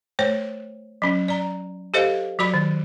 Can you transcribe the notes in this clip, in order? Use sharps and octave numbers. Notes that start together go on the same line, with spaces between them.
A3 C5 C#5
F#3 C#4
D5 A#5
G4 A4 C5 D#5 F5
F#3 F#4 D5 B5
D#3